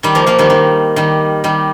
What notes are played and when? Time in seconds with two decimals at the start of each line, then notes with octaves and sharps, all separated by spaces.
0.03 D#3 G3
0.15 F3 A#3
0.26 F3 A#3
0.39 D#3 G3
0.50 D#3
0.96 D#3 G3
1.44 D#3 G3